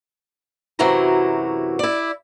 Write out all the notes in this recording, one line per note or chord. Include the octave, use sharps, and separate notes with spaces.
F#2 C3 E3 F#3 E4 A#5
E4 D5